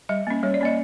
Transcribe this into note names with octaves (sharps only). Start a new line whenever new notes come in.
G3 D#5
A#3 C#4
G3 C#5
D5
A#3 C#4 D#5